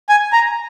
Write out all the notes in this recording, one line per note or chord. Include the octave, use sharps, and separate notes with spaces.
G#5
A#5